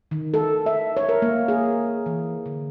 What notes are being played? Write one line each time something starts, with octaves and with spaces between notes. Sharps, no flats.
D#3
A4
E5
C#5
A#4
A#3
G#4
E3
D3